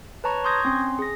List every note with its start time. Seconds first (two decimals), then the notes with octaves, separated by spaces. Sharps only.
0.24 B4 C#5 A5 A#5 C#6
0.44 C6 C#6 D#6 G6 G#6 A#6
0.64 C4 C#4 C6
0.99 G#4 A#6